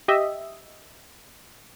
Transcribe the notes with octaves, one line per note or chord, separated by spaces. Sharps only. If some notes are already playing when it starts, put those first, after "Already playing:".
G4 D#5 E5